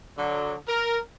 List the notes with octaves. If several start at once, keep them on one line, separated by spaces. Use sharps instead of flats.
D3 F#3
A#4